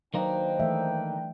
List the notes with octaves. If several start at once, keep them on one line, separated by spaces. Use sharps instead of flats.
D#3 F#3 A#3 D4 D#4 B4 C5 G5
E3 A3 E5